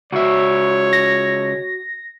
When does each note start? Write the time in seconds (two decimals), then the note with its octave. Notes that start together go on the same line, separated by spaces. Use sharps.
0.13 C#2 F#4 C#5 E5
0.93 A#6